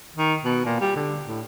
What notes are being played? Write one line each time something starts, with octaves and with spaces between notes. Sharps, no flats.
D#3
B2
A#2
G3
D3
A2